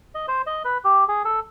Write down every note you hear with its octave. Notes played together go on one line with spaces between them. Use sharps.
D#5
C5
D#5
B4
G4
G#4
A4